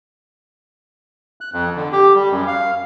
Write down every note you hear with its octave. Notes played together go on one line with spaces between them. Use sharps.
F#6
F2
D3
G4
G3
F#2
F5